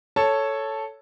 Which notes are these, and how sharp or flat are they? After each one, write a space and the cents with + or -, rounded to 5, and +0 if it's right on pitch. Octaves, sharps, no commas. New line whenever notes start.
A4 +0 C#5 +0 A5 +0